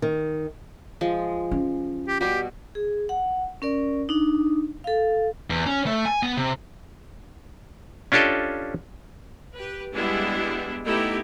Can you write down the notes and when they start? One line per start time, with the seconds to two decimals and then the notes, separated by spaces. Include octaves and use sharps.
0.02 D#3
1.01 F3 G#3
1.51 C#4
2.08 G4
2.21 B2 G3 F#4 G4
2.75 G#4
3.09 F#5
3.62 C#4 A#4 D5
4.09 D4 D#4
4.84 A4 F5
5.50 E2
5.66 C#4
5.86 A3
6.05 G#5
6.23 B3
6.37 C3
8.12 C#4 D4 F4 G4 A4 D#5
9.56 G4 B4
9.95 G3 G#3 B3 D4 E4
10.87 A3 B3 D#4 E4 G4